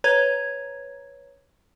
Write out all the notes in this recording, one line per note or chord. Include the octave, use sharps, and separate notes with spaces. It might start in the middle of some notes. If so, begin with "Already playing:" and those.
B4 C#5 A#5 G#6